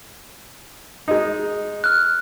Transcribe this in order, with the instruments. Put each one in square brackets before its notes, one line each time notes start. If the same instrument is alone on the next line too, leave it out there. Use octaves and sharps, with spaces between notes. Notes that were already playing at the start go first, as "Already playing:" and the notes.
[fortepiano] G#3 D#4
[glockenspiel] F6 F#6